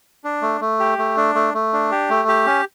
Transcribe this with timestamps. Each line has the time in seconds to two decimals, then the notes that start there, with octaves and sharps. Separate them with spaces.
0.24 D4
0.42 A3
0.61 A3
0.80 G4
0.98 A3
1.17 D4
1.35 A3
1.54 A3
1.73 D4
1.92 G4
2.10 A3
2.28 G4
2.46 C#4